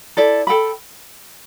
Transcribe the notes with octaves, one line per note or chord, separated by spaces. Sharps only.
E4 A4 D5
A4 G5 B5